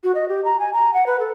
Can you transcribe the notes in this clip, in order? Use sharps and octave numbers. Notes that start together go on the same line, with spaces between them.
F#4
D#5
G4
A#5
G#5
A#5
F#5
B4
A4